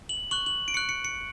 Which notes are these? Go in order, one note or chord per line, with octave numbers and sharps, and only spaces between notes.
F#7
C#6 F#6 F#7
F#7
D7
C#6 F#6 C#7
C#7
C#7